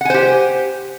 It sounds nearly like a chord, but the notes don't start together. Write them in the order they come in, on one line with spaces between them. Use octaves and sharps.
F#5 G#5 C5 G4